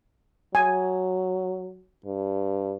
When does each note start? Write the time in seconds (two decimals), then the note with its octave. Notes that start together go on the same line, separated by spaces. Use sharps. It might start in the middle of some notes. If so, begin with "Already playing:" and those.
0.55 F#3 G#5
2.06 G2